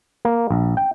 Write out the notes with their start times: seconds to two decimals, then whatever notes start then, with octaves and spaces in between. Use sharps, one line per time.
0.25 A#3
0.50 A#1
0.77 G5